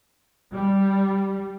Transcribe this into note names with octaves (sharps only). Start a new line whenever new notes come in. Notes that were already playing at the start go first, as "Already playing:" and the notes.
G3